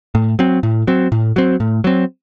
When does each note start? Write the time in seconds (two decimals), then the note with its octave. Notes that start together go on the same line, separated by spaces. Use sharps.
0.15 A2
0.39 F#3 C4
0.63 A2
0.87 F#3 C4
1.12 A2
1.36 F#3 C4
1.60 A2
1.84 F#3 C4